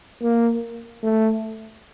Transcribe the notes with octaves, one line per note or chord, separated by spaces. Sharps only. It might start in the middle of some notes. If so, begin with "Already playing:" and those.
A#3
A3